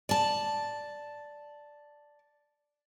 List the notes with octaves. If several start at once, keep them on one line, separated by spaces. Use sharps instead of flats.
D5 A5